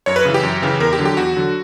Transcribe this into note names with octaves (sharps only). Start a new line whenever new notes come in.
F#2 C#5
B4
C#3 E3
G4
F#2
C#3 E3
E2 A#4
G4
D3 F#3
G4
E2 F#4
D3 F#3